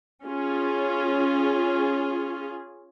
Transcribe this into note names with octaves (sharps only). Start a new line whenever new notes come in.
C#4 F4 G#4